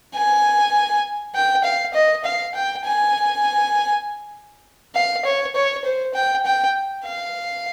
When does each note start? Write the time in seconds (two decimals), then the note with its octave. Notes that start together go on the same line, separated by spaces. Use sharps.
0.15 G#5
1.35 G5
1.64 F5
1.94 D#5
2.25 F5
2.55 G5
2.85 G#5
4.95 F5
5.25 C#5
5.56 C#5
5.84 C5
6.14 G5
6.45 G5
7.05 F5